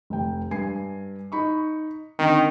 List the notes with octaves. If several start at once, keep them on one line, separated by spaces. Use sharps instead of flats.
F1 G5
G2 G#5 C7
D#4 B5 C#6
D3 D#3 C4